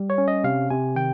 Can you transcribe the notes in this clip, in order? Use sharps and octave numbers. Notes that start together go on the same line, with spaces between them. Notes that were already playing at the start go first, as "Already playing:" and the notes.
Already playing: G3
C#5
C#4
D#5
C3 F5
C3 G#5
D#3 G5